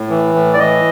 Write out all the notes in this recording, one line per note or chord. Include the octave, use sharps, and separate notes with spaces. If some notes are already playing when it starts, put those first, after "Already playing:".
Already playing: A2
E3
A2
D5
E3 D#5